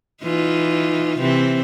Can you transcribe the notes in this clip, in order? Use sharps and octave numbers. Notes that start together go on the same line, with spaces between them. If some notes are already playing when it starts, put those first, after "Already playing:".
E3 D#4 F4
C3 E3 C4